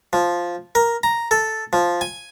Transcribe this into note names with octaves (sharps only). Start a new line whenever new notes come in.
F3
A#4
A#5
A4
F3
G#5